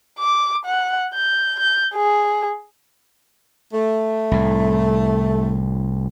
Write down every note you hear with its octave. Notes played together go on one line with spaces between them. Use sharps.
D6
F#5
G6
G6
G#4
A3
C2 A2